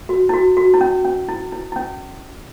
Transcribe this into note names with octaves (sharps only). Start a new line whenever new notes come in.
F#4
E4
F#4
F#4
E4
C#4
C#4
E4
E4
E4
C#4